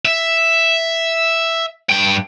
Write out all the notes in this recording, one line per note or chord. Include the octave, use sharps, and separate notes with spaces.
E5
G2 G5